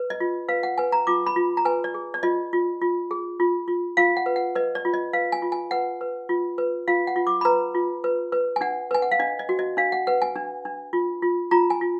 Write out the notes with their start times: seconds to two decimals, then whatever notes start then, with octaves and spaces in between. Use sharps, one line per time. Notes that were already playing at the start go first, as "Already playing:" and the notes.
Already playing: B4
0.10 D#5
0.20 F4
0.49 B4 F5
0.63 F#5
0.78 B4 G#5
0.92 A#5
1.07 F4 D6
1.26 B5
1.36 F4
1.57 A#5
1.65 B4 G#5
1.84 D5
1.94 G#4
2.14 D5
2.23 F4 D#5
2.53 F4
2.81 F4
3.11 G#4
3.40 F4
3.68 F4
3.97 F4 F5
4.17 F#5
4.26 B4
4.36 F#5
4.55 B4 D#5
4.75 D5
4.85 F4
4.94 D#5
5.13 B4 F5
5.32 G#5
5.42 F4
5.52 G#5
5.71 B4 F#5
6.01 B4
6.29 F4
6.58 B4
6.88 F4 F5
7.07 F#5
7.16 F4
7.27 D6
7.41 B5
7.45 B4 A#5
7.75 F4
8.04 B4
8.32 B4
8.56 G#5
8.61 D4 F#5
8.91 B4 G#5
9.02 F#5
9.11 F5
9.20 D4 D#5
9.39 D#5
9.49 F#4
9.59 D#5
9.77 D4 F5
9.92 F#5
10.07 B4 F#5
10.22 G#5
10.36 D4
10.65 D4
10.93 F4
11.22 F4
11.51 F4 A#5
11.70 G#5
11.81 F4